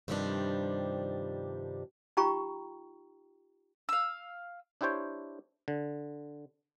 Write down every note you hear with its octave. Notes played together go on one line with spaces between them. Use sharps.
G2 C3 D#3 F3 G3 D4
D#4 F4 G4 G5 A#5 C#6
F5 E6
D4 E4 G4 C5 C#5 G5
D3